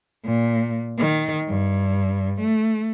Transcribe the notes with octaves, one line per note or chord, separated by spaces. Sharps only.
A#2
D#3
G2
A3